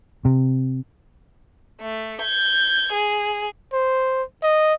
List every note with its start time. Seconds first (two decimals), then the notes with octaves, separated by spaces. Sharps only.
0.25 C3
1.82 A3
2.22 G6 G#6
2.92 G#4
3.73 C5
4.43 D#5